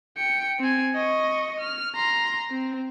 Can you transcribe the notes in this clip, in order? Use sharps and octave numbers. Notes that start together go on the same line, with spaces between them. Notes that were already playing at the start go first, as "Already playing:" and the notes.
G5 C#7
C4 G#5
D#5 C#6
F6
A#5 C6
C4